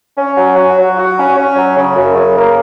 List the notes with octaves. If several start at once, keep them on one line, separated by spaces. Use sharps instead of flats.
C#4
F#3
F#4
F#3
F#4
C#4
C#4
F#3
C#3
F#2
C#3
A#3